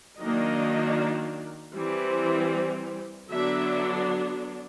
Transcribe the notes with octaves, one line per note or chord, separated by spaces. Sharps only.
D#3 F#3 A#3 D4 D#5
E3 G3 C4
D3 F#3 B3 D4 E5